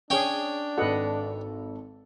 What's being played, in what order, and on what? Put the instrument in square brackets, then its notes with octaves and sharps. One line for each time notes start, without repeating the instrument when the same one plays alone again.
[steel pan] C#4 G#4 [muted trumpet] D4 [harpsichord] C#5 G5
[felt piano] G#1 A4 [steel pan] B4 D#5 F#5